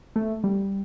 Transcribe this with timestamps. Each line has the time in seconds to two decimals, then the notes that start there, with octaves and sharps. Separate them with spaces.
0.16 A3
0.44 G3